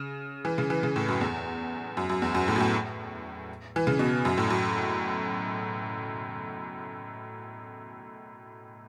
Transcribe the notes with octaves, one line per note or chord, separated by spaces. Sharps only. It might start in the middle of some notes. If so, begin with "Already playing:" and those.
Already playing: C#3
E3
C#3
E3
C#3
A2
F#2
E2
F#2
F#2
E2
F#2
A2
F#2
A2
E3
C#3
B2
F#2
A2
F#2